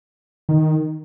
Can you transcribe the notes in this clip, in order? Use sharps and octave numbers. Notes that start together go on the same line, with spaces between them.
D#3